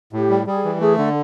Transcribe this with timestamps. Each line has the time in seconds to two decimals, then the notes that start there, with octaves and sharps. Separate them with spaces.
0.13 A2 G4
0.30 G3
0.47 G3 G#4
0.65 E3
0.80 A3 G#4
0.97 D3 A4